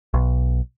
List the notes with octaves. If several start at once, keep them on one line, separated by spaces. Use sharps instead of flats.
B1